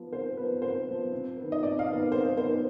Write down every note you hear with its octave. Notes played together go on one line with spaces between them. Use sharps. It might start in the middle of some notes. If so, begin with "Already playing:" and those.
Already playing: F3 B3
C3 C5
F3 B3 B4
C3 C5
F3 B3
C3
D#3 B3
D#5
C3 D5
F5
D#3 B3
C3 C5
D#3 B3 C5